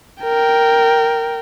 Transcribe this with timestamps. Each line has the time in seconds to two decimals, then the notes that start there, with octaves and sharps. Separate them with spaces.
0.23 A#4 G5